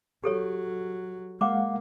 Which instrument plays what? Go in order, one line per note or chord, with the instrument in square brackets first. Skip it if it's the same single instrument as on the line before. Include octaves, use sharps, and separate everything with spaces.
[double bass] F#3 [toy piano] G4 A4 C#5
[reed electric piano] G#3 F5 F#5 [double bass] A#3 [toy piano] D6